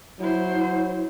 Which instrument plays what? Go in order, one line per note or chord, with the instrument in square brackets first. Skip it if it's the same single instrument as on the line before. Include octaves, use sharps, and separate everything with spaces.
[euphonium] F#3 [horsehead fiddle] E4 C5